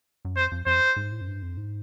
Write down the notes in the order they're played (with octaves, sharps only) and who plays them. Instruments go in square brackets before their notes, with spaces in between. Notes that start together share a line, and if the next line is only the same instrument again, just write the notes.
[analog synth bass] F#2
[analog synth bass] F2 [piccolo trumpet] C5
[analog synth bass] F2
[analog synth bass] F2 [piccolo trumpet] C5
[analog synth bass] G#2
A2
F#2
G2
F2
G#2